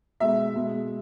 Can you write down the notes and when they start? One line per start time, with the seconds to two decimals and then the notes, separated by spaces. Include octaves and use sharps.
0.20 B2 G#3 E5
0.55 B2 G#3